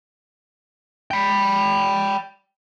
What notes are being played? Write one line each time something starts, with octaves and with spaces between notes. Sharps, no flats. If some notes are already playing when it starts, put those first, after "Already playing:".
G5 B5